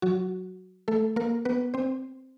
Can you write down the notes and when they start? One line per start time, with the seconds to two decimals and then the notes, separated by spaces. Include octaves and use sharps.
0.02 F#3 F#4
0.88 A3 A4
1.16 A#3 A#4
1.45 B3 B4
1.74 C4 C5